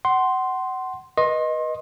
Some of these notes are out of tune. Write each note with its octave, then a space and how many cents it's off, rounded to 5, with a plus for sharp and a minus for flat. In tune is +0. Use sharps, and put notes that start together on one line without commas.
F#5 +25 C6 +0
B4 -25 D#5 +0 C6 +35